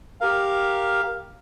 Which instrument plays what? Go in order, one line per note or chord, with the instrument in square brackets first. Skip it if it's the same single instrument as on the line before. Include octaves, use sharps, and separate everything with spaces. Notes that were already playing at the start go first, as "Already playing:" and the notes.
[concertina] G4 A#4 F5